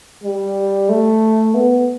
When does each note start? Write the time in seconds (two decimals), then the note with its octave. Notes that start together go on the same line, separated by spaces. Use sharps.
0.24 G3
0.89 A3
1.55 B3